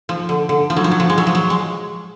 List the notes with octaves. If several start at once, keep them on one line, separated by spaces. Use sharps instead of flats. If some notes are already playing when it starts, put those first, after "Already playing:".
F3
D3
D3
F3
F#3
F3
F#3
F3
G#3
F#3
F3
F#3
G#3